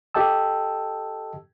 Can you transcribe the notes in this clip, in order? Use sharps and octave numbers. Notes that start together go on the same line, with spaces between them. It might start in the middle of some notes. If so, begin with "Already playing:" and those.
G4 A4 D#5 G5 A5 E6